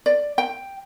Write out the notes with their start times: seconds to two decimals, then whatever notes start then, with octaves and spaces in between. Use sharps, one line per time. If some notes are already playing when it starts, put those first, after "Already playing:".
0.06 D5
0.38 G5